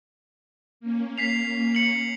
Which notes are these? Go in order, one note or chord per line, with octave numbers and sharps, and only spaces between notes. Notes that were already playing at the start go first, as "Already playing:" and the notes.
A#3 C#4
B6 C7 F7
C#7 F#7